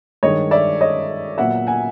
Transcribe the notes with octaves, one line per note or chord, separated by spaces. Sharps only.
G2 D#3 G#3 C#5 D#5
D5 E5
C#5 D#5
A#2 F#3 B3 E5 F#5
F#5 G#5